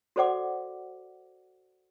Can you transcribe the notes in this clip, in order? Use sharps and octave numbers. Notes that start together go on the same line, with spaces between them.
F#4 A4 C5 D5 F#5 D6